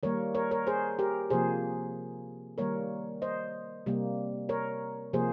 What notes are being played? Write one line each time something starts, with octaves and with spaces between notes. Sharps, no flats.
D#3 G3 A#3 A#4 C#5
A#4 C#5
A#4 C#5
G#4 C5
G4 A#4
C3 F3 A#3 G#4 C5
D#3 G3 A#3 A#4 C#5
C5 D#5
C3 G3 A#3
A#4 C#5
C3 F3 A#3 G#4 C5